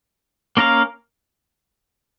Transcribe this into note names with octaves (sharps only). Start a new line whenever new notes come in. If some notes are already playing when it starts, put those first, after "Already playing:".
A#3 C#4 A#4 F5